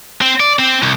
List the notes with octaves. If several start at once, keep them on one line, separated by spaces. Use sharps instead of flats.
C4
D5
C4
C2